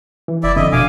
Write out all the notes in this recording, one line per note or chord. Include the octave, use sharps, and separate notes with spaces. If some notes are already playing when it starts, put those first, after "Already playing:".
E3
F#1 E4 D5 E5
F2 D3 D#5 E5
B2 F5 G#5 D6